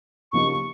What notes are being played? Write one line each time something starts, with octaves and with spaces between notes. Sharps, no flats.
C#3 F3 A#3 D#4 G4 C#6